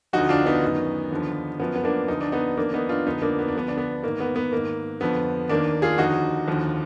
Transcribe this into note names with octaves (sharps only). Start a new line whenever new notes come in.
D2 D3 F3 D#4 F#4
D4 F4
B3 D#4
F#2 D#3
D#2 D3 F3
F#2 F3 B3
B3
A#3 D4
D2 D3 F3 D#4
D4
B3 D#4
F2 D#3 A#3 D4
B3 D#4
D4 F4
D2 D3 F3 B3 D#4
A#3 D4
B3
D4
D2 D3 F3 B3
D4
B3
G#2 D#3 A#3
B3
B3
G#2 D#3 A#3
F2 D3 F3 B3
D#2 D#3 A#3 D4
F4 G#4
D#2 D3 F3 D#4 F#4
D#2 D3 F3